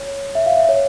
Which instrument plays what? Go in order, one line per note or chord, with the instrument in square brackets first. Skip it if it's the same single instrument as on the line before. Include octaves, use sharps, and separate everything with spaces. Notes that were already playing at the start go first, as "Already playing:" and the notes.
Already playing: [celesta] C#5
E5
F5
E5
C#5